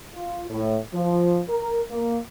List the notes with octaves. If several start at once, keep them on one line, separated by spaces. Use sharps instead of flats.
F4
A2
F3
A#4
A#3